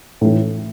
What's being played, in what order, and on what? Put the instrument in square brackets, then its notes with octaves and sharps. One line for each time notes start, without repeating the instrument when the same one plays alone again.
[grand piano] A2 E3